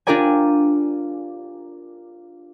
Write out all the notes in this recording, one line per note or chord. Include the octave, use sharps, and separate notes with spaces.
D4 F4 G4 A#4 D5 G#5